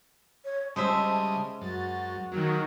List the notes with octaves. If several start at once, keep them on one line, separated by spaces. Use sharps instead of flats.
C#5
C#3 G3 G#3 C5 E5 A5 D#6
F#2 F#4 A6
D#3 F#3 A#3